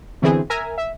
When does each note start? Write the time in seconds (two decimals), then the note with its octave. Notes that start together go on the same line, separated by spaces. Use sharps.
0.22 B2 D3 E3 C4 G#4
0.50 A#4 E5 G#5 A#5
0.78 E5